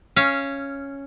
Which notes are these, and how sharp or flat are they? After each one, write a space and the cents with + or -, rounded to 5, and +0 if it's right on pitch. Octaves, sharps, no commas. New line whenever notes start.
C#4 +0 F5 -25